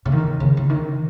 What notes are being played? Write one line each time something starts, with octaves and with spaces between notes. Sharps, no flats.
C#3
D#3
C#3
C#3
D#3